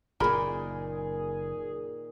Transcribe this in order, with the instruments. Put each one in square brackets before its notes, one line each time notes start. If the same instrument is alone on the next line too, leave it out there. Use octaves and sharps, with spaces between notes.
[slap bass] F#1 [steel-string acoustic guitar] A#2 D#3 [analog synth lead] G#4 [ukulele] A#4 B5